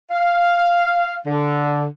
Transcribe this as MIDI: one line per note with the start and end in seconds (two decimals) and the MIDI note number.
0.11 1.15 77
1.27 1.84 50